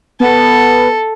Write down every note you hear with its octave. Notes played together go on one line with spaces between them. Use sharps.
B3 A4